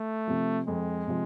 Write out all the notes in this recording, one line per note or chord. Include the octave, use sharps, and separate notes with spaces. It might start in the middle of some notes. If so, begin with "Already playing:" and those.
Already playing: A3
C3 F3
F2 G#3
C3 F3